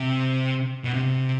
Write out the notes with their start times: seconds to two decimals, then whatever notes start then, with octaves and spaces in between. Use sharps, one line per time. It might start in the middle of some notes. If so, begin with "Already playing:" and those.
Already playing: C3
0.84 B2
0.94 C3